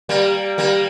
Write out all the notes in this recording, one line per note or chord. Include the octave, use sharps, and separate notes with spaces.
G3 A#3
G3 A#3